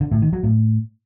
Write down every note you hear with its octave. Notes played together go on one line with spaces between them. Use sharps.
D3
A2
D#3
F#3
A2